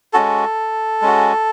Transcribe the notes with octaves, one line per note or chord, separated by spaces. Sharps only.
G#3 C#4 F#4 A4
G#3 C#4 F#4